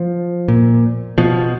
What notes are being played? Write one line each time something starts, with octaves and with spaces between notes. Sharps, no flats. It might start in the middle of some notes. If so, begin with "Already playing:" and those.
Already playing: F3
A#2
B2 F3